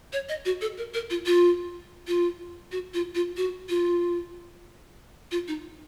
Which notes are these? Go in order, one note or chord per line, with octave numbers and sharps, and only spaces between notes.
C#5
D#5
F#4
A4
A#4
A#4
F4
F4
F4
F#4
F4
F4
F#4
F4
F4
D#4